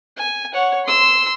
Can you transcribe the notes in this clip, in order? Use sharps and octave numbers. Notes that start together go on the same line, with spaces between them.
G#5
C#5 F#5
C6 E6